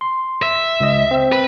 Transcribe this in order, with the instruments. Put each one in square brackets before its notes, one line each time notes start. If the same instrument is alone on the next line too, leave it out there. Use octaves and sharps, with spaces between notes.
[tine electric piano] C6
[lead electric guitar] E5
[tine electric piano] C#2 D#5
C4
[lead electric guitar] B4